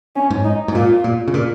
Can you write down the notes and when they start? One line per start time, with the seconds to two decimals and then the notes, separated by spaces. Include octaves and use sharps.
0.16 C#4
0.30 G#2
0.45 D#4
0.68 G#2
0.74 A#2 F4
1.04 A#2
1.28 C#3
1.34 A#2